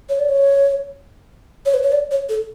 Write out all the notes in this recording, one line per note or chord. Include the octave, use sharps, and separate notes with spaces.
C#5
D5
C#5
C#5
B4
C#5
D5
C#5
A4